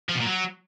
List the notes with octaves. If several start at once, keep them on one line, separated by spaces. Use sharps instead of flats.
F3
B2
A#2
F#3